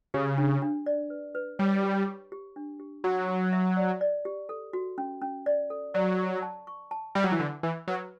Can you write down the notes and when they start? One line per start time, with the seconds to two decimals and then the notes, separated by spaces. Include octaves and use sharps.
0.14 C#3 G4
0.38 D4
0.62 D4
0.86 D5
1.10 B4
1.35 B4
1.59 G3 C#5
1.83 G4
2.07 G4
2.32 G4
2.56 D4
2.80 G4
3.04 F#3 F#4
3.28 F#4
3.53 E5
3.77 D5
4.01 D5
4.25 G4
4.49 A4
4.73 F#4
4.98 C#4
5.22 C#4
5.46 D5
5.70 A4
5.94 F#3 D5
6.18 C#6
6.42 A5
6.67 C#6
6.91 A5
7.15 G3 E5
7.24 F#3
7.32 E3
7.40 D3 F#5
7.63 E3 B5
7.88 F#3 B4